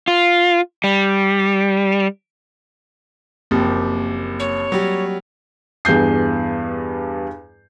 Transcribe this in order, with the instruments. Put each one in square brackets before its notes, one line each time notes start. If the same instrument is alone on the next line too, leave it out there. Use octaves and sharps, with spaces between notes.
[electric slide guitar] F4
G3
[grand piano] F#1 F3 [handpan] A#3 C4 G4
[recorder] C#5
[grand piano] F#3 G3
[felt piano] E2 G2 G#4 G6 C7